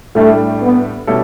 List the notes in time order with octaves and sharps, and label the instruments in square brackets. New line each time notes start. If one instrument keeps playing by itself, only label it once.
[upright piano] A2 G3 D4 G4 [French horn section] A3
[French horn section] B3
[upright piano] B2 G3 C#4 E4 A4